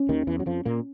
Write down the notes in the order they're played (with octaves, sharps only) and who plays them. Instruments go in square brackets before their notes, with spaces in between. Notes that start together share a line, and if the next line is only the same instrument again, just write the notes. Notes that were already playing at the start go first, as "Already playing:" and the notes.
Already playing: [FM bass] C#4
[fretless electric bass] D#2 D#3
E2 E3
F#3
F2 F3
A#2 A#3